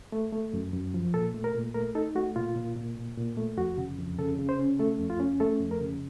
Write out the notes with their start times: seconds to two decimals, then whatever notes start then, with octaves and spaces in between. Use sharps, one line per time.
0.12 A3
0.32 A3
0.54 F#2
0.73 F#2
0.94 F3
1.14 A#2 A4
1.34 A3
1.44 A#4
1.55 A#2
1.74 A3 A#4
1.95 D#4 A4
2.15 A3 F#4
2.36 A#2 F4
2.56 A#2
2.76 A#2
2.97 A#2
3.17 A#2
3.37 A3
3.57 F2 F#4
3.78 C#3
3.99 F2
4.19 C#3 A4
4.39 C#3
4.49 C5
4.59 C#4
4.79 A3 A4
4.99 F2
5.10 F4
5.20 C#4
5.40 A3 A4
5.60 F2
5.71 A#4
5.81 C#3